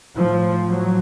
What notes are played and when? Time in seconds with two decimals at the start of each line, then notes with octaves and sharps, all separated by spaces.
0.16 A2 F3
0.69 F#3